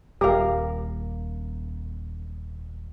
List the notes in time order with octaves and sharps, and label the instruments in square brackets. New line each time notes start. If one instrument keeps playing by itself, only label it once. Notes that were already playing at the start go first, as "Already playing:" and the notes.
[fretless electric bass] D#1 [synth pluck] G4 [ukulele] A#4 F5